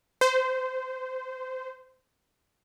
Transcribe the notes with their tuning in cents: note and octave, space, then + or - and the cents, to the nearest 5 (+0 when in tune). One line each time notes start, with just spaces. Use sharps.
C5 -20